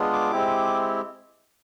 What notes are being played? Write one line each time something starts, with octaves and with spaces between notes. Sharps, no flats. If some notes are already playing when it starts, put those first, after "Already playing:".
Already playing: G#3 B3 D4 F4 G#4
D6
G#3 C4 E4 G4